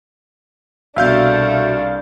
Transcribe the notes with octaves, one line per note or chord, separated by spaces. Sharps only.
C2 B2 A3 D4 F#4 E5 F5 G6